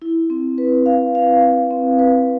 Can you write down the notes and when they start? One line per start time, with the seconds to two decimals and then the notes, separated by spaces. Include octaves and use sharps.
0.02 E4
0.30 C4
0.58 B4
0.86 F5
1.15 F5
1.42 F5
1.71 C4
1.99 B4